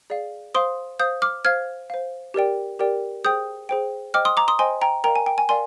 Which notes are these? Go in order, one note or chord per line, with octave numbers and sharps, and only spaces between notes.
G#4 D5 F5
C5 F5 C6 D#6
C5 F5 D#6 G6
D6 F6
C5 F5 F6 G#6
C5 F5
G4 A#4 D5 G5
G4 A#4 D5 G5
G#4 C5 G5 D#6 G6
G#4 C5 G5
C5 D#5 G5 D6 F6
C6 D#6
A#5 D6
C6 D#6
C5 D#5 G5 G#5 C6
G5 A#5
A#4 D5 F5 G5 A#5
G#5
G5
G#5
A#4 D5 F5 G#5 C6